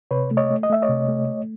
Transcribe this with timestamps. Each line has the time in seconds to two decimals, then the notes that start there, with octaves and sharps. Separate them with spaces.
0.11 C3 B4 C#5
0.31 A3
0.37 C#5 D#5
0.51 A3
0.63 D#5
0.69 A3 E5
0.82 C#5 D#5
0.89 C3
1.09 A3
1.28 A3